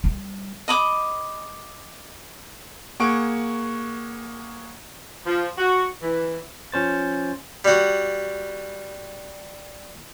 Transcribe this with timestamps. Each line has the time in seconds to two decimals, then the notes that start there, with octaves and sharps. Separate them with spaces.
0.04 G3
0.68 D#5 B5 D6
3.00 A#3 G#4 F#5 C#6 D7
5.26 F3
5.58 F#4
6.02 E3
6.72 F3 C#4 C5 A6
7.65 G3 F#4